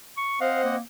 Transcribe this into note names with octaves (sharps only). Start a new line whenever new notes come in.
C#6
C4 C5 D#5 F5 F#5
A#3